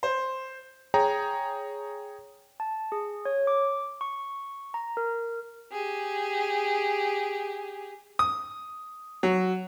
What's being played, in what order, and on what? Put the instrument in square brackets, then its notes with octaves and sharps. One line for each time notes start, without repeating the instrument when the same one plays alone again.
[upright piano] C5
[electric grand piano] G#4 C#5 G5 A#5
[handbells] A5
G#4
C#5
D6
C#6
A#5
A#4
[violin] G4 G#4
[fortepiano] D#6
F#3